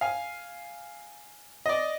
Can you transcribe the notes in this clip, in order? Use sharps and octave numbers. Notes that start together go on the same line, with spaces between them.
F5 G#5
D5 D#5